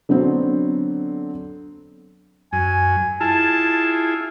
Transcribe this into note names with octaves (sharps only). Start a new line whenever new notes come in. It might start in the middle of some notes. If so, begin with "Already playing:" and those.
D3 F#3 B3 C4
F#2 G#5
E4 F4 G#4 A5